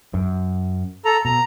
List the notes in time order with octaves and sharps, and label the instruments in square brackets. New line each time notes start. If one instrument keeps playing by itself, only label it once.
[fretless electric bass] F#2
[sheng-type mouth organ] A4 A#5
[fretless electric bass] B2 [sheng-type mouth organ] A#5